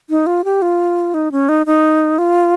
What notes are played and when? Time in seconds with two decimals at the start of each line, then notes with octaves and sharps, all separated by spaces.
0.10 D#4
0.26 F4
0.44 G4
0.62 F4
1.14 D#4
1.32 C#4
1.49 D#4
1.66 D#4
2.18 F4